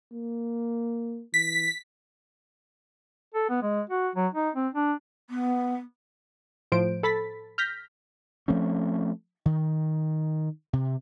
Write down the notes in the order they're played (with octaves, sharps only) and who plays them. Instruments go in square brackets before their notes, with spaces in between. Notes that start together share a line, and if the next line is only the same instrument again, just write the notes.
[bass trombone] A#3
[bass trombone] E3 [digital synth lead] B6
[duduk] A4
B3
G#3
F#4
F#3
D#4
C4
D4
[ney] B3
[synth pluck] A2 F3 C5 D7
A4 B5 A6 B6
F6 G6 A#6 B6
[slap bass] F3 A3 C4 C#4
D#3
C3